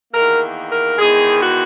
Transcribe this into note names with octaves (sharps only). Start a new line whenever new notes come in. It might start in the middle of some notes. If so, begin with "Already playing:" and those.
E2 D#3 A#3 A#4
A#4
E2 D#3 G#3 G#4
F#4